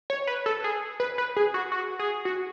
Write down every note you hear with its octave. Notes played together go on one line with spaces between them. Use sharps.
C#5
B4
A4
G#4
B4
B4
G#4
F#4
F#4
G#4
F#4